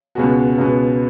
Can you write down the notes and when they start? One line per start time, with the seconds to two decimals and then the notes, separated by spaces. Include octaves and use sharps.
0.15 C#2 B2 G#3 B3 F#4
0.58 C#2 B2 G#3 B3